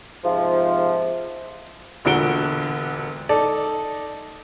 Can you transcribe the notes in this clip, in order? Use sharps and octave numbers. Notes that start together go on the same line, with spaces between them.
G#2 C3 F3
E1 A#2 D3 F#4 D7 G7
D#4 A4 D5